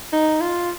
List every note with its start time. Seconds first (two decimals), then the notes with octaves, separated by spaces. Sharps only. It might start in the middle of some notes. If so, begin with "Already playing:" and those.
0.13 D#4
0.41 F4